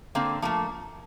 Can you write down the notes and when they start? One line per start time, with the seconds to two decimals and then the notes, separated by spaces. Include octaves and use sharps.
0.15 D3 A#3 C4
0.42 F3 A3 A#3